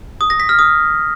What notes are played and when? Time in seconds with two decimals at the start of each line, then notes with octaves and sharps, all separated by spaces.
0.21 D#6
0.30 A#6
0.40 B6
0.49 F6
0.59 D#6